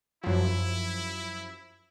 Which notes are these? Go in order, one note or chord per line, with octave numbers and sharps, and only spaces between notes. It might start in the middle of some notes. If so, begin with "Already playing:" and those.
F#2 F3 E4